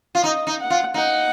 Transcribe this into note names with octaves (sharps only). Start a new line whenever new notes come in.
F4
D#4 D#5
D#4
F#5
F4
D#4 F#5